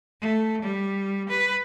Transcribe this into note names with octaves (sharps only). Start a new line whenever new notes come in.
A3
G3
B4